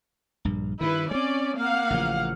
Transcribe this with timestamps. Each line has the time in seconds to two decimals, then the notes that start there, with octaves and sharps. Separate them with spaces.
0.45 A#1 G2
0.81 G2 D#3 E4 B4
1.11 G#3 C4 C#4 D5
1.57 A#3 F5 F#5
1.90 A1 C#3 F3